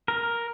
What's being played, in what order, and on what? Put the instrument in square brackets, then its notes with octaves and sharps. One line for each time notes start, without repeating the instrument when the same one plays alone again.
[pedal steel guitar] A#4